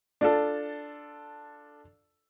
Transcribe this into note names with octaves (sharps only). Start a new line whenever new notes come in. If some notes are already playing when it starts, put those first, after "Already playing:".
D4 F4 A4